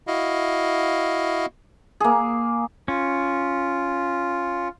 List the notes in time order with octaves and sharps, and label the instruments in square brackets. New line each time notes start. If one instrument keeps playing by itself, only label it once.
[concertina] E4 F#4 D#5 F5
[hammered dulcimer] A#3 G#4
[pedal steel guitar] C#4 [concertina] F4